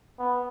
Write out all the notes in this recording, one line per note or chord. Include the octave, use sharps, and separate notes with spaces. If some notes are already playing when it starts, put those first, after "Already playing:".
B3